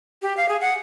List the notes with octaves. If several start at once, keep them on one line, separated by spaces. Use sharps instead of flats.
G4
F5
G#4
F#5